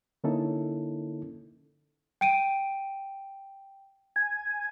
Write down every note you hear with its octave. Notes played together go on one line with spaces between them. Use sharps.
D3 A#3 C#4 D#4 E4 A4
G5 D7 D#7
G#5